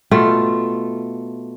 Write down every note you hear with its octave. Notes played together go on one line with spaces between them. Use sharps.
B2 A3 F4